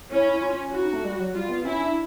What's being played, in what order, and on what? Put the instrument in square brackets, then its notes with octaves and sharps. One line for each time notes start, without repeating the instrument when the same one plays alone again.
[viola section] C#4 [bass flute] E4
[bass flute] E4
F4
[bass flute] E4 [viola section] F#4
[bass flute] D#4
A3
G3
F#3
[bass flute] G3 [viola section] F4
[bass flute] B3
[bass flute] C#4 [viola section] E4
[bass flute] D4